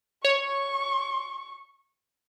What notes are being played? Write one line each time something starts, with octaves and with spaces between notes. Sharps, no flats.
C#5 C#6